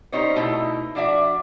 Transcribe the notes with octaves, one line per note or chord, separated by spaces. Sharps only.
G3 C#4 D#4 C5 C#5
B2 A3 D#4 E4
F3 D4 F#4 D5 E5